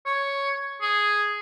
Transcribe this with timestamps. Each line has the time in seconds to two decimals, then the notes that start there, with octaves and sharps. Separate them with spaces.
0.06 C#5
0.81 G#4